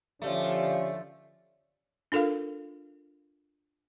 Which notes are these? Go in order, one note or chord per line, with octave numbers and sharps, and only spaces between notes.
D3 F3 A3 C#4 G4 D5 F5
D4 F4 A4 A#4 F5